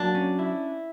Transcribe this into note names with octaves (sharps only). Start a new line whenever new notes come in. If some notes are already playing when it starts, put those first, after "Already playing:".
Already playing: F#3 A#3 D4
C#4
E4